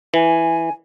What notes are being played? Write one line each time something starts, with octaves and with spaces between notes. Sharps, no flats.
E3 G#5